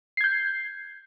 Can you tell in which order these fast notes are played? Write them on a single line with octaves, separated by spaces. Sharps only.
C7 G#6 G6